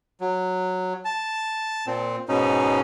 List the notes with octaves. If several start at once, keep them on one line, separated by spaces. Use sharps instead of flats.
F#3
A5
A#2 C4
G#2 B2 C#4 D#4